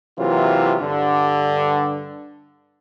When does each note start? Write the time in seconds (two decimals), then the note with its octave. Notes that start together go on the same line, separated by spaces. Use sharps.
0.18 C3 E3 F#3 A#3 F4
0.81 G2 D3